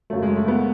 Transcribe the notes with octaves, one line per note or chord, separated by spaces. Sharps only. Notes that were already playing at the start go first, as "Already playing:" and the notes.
F#2 C#3 F#3 A3
G#3
A3
B3